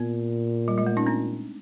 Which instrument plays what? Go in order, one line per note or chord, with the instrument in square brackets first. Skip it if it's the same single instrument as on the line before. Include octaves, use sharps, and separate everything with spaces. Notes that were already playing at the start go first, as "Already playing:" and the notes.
Already playing: [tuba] A#2 [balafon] B3
[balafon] G3
G#3
A3
C#4 D#4
C4 D4